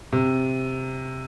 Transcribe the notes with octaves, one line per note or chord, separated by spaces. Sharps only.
C3